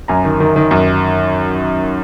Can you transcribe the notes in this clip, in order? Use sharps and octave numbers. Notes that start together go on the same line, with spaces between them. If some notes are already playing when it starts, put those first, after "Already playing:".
F#2 G#5 A#5
D#3
D#3
D#3
F#2